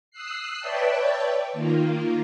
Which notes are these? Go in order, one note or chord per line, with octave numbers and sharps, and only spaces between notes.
D#6 E6 F#6 C7
B4 C#5 D5 E5 G5 A5
D#3 A#3 F4